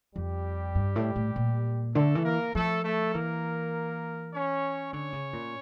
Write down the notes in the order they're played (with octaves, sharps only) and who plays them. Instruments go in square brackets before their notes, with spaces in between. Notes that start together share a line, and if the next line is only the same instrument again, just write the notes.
[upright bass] F2 [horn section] G3 G4
[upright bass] G2
A2
A2
A#2
[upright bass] D3 [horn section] A3 A4
[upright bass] E3
[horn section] A#3 A#4
[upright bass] F3 [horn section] A3 A4
[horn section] A3 A4
[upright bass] E3 [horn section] A#3 A#4
[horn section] C#4 C#5
[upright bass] D3 [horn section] C#4 C#5
[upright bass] C#3
A#2